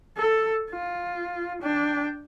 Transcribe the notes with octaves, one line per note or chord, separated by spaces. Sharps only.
A4
F4
D4 G5